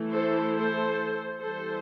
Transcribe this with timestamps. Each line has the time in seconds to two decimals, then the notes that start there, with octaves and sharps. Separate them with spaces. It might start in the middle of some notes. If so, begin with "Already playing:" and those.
Already playing: E3 A3 E4
0.14 A4 C5
0.56 A4 C5
1.41 E3 G3 B3 E4 A4 C5